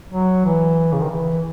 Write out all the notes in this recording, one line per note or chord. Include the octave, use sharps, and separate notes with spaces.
F#3
E3
C#3
D#3
E3